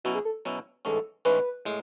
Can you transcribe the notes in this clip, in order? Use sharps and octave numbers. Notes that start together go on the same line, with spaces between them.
B2 F#3 C#4 E4 F#4
G#4
A4
B2 F#3 C#4 E4
A1 G#2 E3 G#3 C#4 A4
A1 G#2 E3 G#3 C#4 B4
A2 G#3